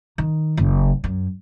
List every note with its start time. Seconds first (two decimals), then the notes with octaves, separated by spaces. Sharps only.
0.18 D#3
0.57 F#1
1.04 F#2